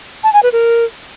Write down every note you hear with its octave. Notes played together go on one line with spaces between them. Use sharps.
A5
G#5
B4
A#4